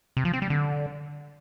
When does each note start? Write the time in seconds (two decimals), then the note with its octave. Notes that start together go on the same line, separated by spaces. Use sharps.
0.17 C3
0.25 F3
0.33 C4
0.42 G3
0.50 D3